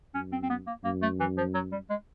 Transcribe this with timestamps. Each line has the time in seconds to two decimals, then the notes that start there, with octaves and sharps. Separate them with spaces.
0.14 F#2 C#4
0.32 C4
0.43 C4
0.50 B3
0.67 A#3
0.84 F#2 A#3
1.02 A3
1.20 E3
1.38 F3
1.55 F#3
1.72 G3
1.90 G#3